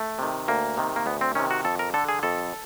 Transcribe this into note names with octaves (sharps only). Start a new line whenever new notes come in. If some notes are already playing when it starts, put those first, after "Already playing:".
Already playing: A3
C3 D#3
D2 A#3
C3 D#3
A#3
D2 B3
C4
C3 D#3 C#4
F#4
F2 A4
A#4
D3 A4
G#4
F2 A4